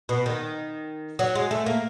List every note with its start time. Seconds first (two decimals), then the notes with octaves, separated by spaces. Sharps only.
0.09 B2
0.26 D#3
1.19 F#3
1.35 G#3
1.51 A3
1.66 A#3